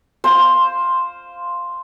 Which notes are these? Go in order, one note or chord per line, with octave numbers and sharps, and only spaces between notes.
C5 F5 C6